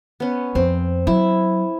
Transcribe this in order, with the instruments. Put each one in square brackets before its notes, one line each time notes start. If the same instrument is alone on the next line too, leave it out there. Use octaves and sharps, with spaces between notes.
[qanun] B3 C#4
[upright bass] F2 [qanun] C4
[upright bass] F#3 [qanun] E4